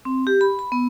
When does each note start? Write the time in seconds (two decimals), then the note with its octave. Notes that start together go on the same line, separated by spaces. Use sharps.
0.05 C4
0.27 G4
0.41 B5
0.59 B5
0.72 B3